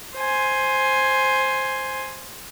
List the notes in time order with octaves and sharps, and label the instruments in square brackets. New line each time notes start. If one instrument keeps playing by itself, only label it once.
[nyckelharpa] C5 G#5